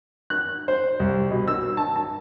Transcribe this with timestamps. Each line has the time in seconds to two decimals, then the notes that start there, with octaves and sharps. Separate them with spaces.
0.30 F#6
0.68 C5
1.00 C2
1.31 B2
1.48 E6
1.77 A5
1.96 A5